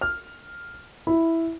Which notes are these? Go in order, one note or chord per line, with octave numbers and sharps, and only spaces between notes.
F6
E4